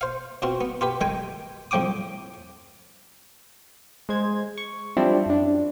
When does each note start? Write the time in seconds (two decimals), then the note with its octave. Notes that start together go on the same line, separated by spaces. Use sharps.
0.01 C5 F5
0.42 B2 C4 F4 F#4
0.61 B3
0.81 F4 G4 B4
1.01 D#3 G#3 G5 G#5
1.71 C2 G#2 F3 G5 D6 D#6
4.09 G#3 C5 G#6
4.58 C#6
4.97 F3 G3 C4 D4 E4
5.26 F#2 D4